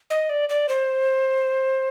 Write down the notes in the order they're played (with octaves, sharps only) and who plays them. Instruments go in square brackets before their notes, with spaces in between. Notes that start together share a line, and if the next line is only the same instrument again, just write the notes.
[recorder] D#5
D5
D5
C5